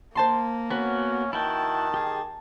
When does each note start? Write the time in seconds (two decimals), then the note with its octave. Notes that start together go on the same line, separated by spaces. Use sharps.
0.15 A#3 C5 A5 C6
0.70 B3 C#4 F#4 B4
1.33 D#3 E4 F#4 G5 A5
1.94 G4 G#4